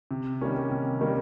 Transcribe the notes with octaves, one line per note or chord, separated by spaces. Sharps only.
C3
D#3 G3 A#3 C#4
C3
D#3 G3 A#3 C#4